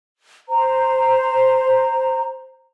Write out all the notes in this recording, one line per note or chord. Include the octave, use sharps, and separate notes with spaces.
C5 A#5